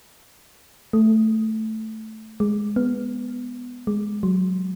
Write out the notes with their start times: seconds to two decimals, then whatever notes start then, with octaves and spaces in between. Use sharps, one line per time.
0.93 A3
2.40 G#3
2.76 B3
3.87 G#3
4.23 F#3